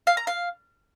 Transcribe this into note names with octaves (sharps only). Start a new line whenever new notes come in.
F5
A#5
F5